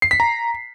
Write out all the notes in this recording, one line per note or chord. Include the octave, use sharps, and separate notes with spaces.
C7
B6
A#5